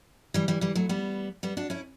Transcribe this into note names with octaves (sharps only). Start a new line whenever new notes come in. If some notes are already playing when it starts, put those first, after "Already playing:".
E3 G3
E3 G3
E3 G3
F#3 A3
G3 B3
G3 B3
D4 F#4
C#4 E4